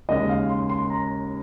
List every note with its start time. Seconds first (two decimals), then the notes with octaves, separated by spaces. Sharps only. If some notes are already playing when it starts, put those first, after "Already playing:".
0.09 D#2 C#3 G#3 D#5
0.29 F5
0.49 C6
0.69 C6
0.90 A#5